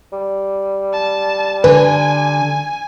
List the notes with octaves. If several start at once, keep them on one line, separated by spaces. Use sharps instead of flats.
G3
A5
D3 B4 G#5